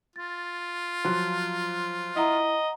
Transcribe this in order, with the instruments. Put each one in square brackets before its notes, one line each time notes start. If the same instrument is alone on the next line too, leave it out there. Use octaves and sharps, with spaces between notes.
[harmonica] F4 [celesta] A6
[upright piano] F3 F#3 [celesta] F5 C6
[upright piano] E4 [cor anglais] D#5 [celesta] F#5 A#5